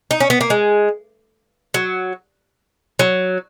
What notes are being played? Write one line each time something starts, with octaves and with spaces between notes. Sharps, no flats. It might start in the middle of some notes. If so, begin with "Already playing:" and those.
D#4
C#4
B3
A#3
G#3
F#3
F#3